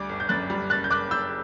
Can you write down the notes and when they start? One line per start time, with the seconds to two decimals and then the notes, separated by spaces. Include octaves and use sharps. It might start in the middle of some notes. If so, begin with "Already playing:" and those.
Already playing: D2 G3 D6
0.09 G1
0.20 G6
0.29 F#2 F#6 A6
0.50 G3
0.70 F#1 F#6 A6
0.84 G6
0.91 F#1 D6 F#6
1.11 F#1 E6 G6